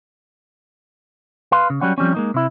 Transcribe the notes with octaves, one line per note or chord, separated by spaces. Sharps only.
B4 F5 C6
C#3
F#3 G3 C#4 F#5
F3 G3 C4 C#4
G#3 A#3 D#4
C3 E4